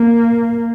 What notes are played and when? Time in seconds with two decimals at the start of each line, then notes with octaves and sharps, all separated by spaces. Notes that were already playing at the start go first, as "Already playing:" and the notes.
Already playing: A#3